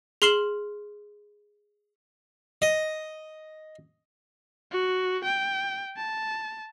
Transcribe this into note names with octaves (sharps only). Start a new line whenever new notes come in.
G#4 C6 F6 C7 E7 F#7
D#5
F#4
G5
A5